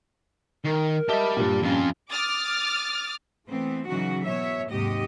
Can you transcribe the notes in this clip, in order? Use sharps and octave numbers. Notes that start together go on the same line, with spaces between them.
D#3 A#4
G4 D#5 E5 A5 B5
G2 A#2
F2 C#4 F4
D6 D#6 F6 A6
E3 A3 B3 C4
C#3 E3 F#3 D#4 F#4
B2 C#5 E5
D#2 G#2 C3 F#3 G4 D#5